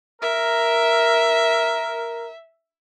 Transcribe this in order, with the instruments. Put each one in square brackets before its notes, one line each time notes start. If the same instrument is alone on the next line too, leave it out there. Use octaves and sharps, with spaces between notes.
[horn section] A#4 [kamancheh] E5